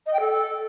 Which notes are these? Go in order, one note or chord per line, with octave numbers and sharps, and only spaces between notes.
D#5
G5
A4